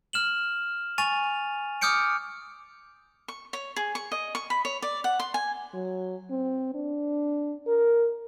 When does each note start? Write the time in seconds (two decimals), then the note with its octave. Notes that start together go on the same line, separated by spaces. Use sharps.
0.13 F6 E7 F#7
0.98 G#5 C#6 A6 D#7 F7
1.81 D6 D#6 F6 G6 C#7 D7
3.28 C#6
3.53 C#5
3.76 G#4
3.95 C#6
4.12 D#5
4.35 C#6
4.50 B5
4.65 C#5
4.82 D5
5.04 F#5
5.20 C6
5.34 G#5
5.74 F#3
6.31 C4
6.75 D4
7.68 A#4